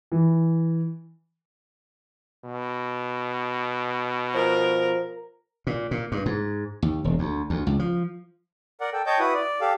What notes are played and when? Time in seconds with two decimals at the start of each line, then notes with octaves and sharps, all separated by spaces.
0.12 E3
2.45 B2
4.34 F3 A#4
5.67 A#2
5.91 A#2
6.12 G2
6.26 G#2
6.82 D#2
7.04 E1
7.19 D2
7.50 D2
7.67 C#2
7.79 F3
8.81 A#4 D5 F#5
8.93 A4 G5
9.06 C#5 D#5 G5 A5 G6
9.19 E4 F#4 B4 D#6
9.34 D5
9.61 G4 A4 F5